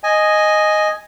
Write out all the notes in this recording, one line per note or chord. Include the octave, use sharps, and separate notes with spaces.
D#5 G#5